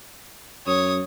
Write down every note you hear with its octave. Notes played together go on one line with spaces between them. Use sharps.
F#2 C#5 D#6